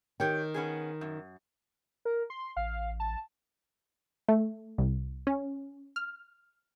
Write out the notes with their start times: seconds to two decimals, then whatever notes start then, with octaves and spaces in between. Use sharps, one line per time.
0.20 D#3 G4 C#5 G5
0.54 B3 C#4 G#4
1.01 F#2
2.05 A#4
2.30 C6
2.57 A1 F5
3.00 A5
4.29 A3
4.78 C2
5.27 C#4
5.96 F6